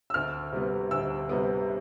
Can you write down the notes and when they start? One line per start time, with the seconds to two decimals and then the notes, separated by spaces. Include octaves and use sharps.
0.10 E6
0.14 D2 F6
0.52 C3 G3 B3
0.91 D2 E6
1.29 C3 G3 B3